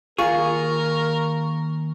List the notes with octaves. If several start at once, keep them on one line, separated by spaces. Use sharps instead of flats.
D#2 F4 G#4 A#4 C#6